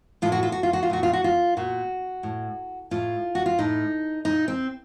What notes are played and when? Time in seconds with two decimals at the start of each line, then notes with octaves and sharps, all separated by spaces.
0.22 A2 F4
0.32 F#4
0.43 F4
0.52 F#4
0.63 F4
0.73 F#4
0.83 F4
0.90 A#2 F#4
1.03 F4
1.13 F#4
1.24 F4
1.57 A#2 F#4
2.23 A2
2.91 A2 F4
3.35 F#4
3.46 F4
3.58 A2 D#4
4.25 A#2 D#4
4.48 C4